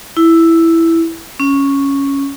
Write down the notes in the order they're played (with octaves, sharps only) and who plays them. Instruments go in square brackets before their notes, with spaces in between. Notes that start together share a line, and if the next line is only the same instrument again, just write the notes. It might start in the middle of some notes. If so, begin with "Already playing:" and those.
[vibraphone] E4
C#4